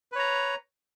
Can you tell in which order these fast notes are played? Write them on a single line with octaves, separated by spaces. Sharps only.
B4 C#5 A#5